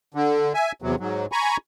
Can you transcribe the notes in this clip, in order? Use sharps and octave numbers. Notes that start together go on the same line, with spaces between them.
D3
E5 G#5
E2 C3 F#3
G#2 F#3
G#5 A#5 B5 C#6